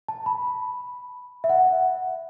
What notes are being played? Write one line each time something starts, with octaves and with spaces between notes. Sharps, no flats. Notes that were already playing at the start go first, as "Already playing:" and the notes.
A5
B5
E5
F#5